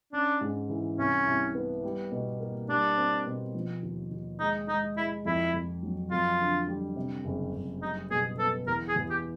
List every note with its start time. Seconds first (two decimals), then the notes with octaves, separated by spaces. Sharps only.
0.12 C#4 D4
0.41 G#2
0.70 E3
0.98 C2 C#4
1.27 C2
1.55 B3
1.84 G3
2.12 B2
2.40 A#3
2.69 G3 D4
2.97 C4
3.26 B2
3.55 F3
3.83 D#2
4.11 D#2
4.40 G#3 D#4
4.68 G#3 D#4
4.97 G#3 E4
5.25 F2 E4
5.54 F2
5.83 F#3
6.11 F2 F4
6.40 D3
6.68 G3
6.96 C3
7.25 F#1
7.53 F#1
7.82 G3 D#4
8.11 B2 G#4
8.39 B3 A4
8.67 E2 A#4
8.89 G#4
8.96 E2
9.10 G4